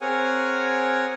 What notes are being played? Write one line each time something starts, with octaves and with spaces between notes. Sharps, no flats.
C4 G#4 A#4 C#5 F#5 G#5